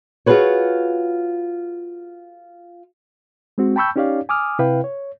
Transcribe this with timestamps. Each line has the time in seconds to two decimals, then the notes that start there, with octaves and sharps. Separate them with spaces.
0.26 F4 F#4 G#4 A4 B4 C#5
3.58 G#3 C4 F#4
3.76 G5 A5 B5 C#6 E6 G6
3.96 C#4 D#4 G4 C#5 D5 F5
4.29 G#5 D6 D#6 F6
4.59 C3 E4 B4 F5 G5
4.84 C#5